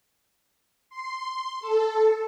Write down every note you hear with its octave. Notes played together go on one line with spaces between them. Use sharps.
C6
A4